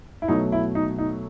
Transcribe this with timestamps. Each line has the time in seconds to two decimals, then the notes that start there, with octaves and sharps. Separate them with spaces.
0.22 E4
0.28 B2 F#3 A3 D#4
0.52 E4
0.75 D#4
0.98 D#4